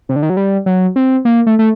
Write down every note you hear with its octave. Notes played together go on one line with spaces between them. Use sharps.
C3
D3
D#3
F#3
G3
F#3
C4
A#3
A3
A3